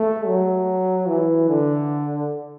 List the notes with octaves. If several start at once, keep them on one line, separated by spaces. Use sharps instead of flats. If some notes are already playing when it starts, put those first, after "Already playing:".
Already playing: A3
F#3
E3
D3